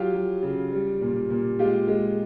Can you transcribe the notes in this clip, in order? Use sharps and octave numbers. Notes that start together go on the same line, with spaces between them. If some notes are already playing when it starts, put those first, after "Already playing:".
Already playing: F#3 F4 G4
F#3
C#3
G3
A#2
A#2
G#3 F4 G4
G#3